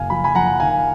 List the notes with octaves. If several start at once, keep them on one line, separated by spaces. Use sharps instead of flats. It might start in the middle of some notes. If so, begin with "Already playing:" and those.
Already playing: F#1 F5 G#5
F3 B5
G#5 B5
F3 F#5 A#5
D#3 F5 G#5